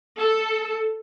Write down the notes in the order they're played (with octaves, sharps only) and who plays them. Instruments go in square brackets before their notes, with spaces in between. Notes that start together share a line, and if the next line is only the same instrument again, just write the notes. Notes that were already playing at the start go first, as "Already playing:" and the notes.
[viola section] A4